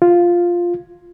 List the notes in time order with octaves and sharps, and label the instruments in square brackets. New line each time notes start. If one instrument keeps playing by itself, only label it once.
[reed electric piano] F4